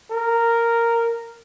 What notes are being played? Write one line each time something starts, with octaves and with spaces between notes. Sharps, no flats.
A#4